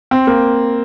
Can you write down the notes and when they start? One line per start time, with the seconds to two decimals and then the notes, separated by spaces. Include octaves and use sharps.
0.11 C4
0.27 A#3